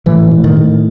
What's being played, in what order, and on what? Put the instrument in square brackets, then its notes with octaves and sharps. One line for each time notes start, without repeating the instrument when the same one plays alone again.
[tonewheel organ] A2 [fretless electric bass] E3
[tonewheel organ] A2
[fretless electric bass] D#3
[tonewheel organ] A2